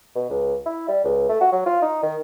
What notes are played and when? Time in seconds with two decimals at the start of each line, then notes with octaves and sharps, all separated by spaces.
0.15 B2
0.30 C#2
0.66 E4
0.88 G3
1.04 C#2
1.29 A3
1.41 F#4
1.52 F#3
1.66 F4
1.82 D#4
2.03 D#3